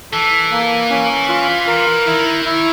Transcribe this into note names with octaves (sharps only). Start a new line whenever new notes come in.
E3 A4
A#3
C#4
F4
A#4
D#3 E4
E4